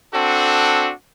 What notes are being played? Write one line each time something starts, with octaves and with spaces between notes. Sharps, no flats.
C4 D4 F#4 A4